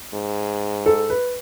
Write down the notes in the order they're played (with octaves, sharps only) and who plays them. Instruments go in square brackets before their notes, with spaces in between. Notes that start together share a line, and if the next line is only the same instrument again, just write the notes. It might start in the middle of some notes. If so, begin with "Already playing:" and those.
[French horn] G#2
[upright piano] A4
B4